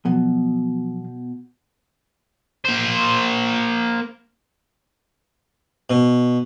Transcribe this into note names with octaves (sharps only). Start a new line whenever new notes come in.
B2 F3 F#3
A#3 C5
B2